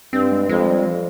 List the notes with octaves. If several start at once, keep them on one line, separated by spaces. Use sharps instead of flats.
G2 C4
G#3
F2 G#3
G3
F3